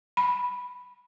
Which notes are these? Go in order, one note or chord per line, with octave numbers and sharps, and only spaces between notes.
B5